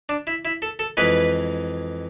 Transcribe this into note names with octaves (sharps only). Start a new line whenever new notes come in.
D4
E4
E4
A4
A4
F2 E3 G#3 B4